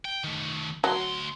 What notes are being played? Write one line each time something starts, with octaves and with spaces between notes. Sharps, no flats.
G5
D#3 A3
D2 F#3 C6